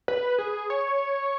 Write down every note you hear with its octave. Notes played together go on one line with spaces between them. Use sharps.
B4
G#4
C#5